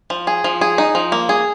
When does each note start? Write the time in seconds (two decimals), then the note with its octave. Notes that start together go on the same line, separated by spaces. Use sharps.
0.10 F3
0.27 G#4
0.44 F3
0.61 G#4
0.78 D#4
0.95 F3
1.12 A#3
1.29 G#4